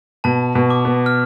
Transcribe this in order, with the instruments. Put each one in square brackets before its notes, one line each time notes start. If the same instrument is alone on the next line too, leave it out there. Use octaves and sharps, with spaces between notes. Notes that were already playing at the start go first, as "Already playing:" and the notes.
[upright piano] B2 [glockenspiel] A5
[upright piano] B2
[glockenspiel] D6
[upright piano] B3
[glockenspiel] F6